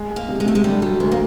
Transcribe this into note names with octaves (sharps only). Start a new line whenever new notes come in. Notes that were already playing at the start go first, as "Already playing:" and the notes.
Already playing: G#3
G#3
A#3
C3
G#3
C3 A3
G#3
D3 G3
F#3 G3
D2 G#3
A#3